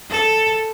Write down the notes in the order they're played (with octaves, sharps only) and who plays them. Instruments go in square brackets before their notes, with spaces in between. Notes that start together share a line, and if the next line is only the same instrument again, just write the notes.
[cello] A4